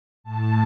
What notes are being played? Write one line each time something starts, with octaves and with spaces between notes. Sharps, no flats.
A2 A5